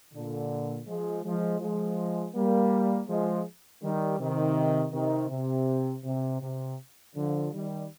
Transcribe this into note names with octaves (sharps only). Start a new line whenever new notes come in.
A#2 D3
F3 G#3
F3 G#3
F3 G#3
G3 A#3
F3 G#3
D#3 G3
C3 D#3
C3 D#3
C3
C3
C3
D3 F3
D#3 G3